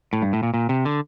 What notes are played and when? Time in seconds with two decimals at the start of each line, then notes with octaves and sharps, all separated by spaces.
0.13 A2
0.22 G2
0.33 A2
0.43 A#2
0.54 A#2
0.69 C3
0.85 D3